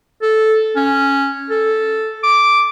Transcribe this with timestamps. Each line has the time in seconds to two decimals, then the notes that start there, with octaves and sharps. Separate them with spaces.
0.22 A4
0.76 C#4
1.50 A4
2.23 D6